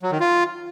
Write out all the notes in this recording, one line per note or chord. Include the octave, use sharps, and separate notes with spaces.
F#3
D#3
F4